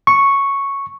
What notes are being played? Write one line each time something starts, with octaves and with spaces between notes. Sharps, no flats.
C#6